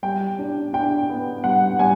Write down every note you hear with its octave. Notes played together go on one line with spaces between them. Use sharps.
G3 G5
D4
D4 G5
B3
G3 F#5
G3 G#5